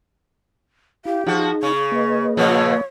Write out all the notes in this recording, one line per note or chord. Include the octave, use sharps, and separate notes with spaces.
E4 G4 F5
F3 D#4 F#4 G#4
C#3 C#6
A#3 B4 D#5
A#2 C#3 F3 C#5